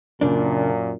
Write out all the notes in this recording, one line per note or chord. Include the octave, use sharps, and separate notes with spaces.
F#2 A#2 C#3 A#3 D4